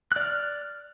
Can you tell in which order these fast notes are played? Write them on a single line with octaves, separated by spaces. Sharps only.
F#6 D5 F6